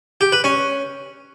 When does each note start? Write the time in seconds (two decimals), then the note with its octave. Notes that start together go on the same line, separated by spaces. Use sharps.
0.21 G4
0.32 B4
0.44 C#4